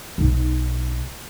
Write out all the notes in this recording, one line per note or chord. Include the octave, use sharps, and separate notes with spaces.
B1 D#4